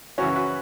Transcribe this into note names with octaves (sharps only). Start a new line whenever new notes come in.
F#2 C#3 E3 C#4 F#4
F#4 B4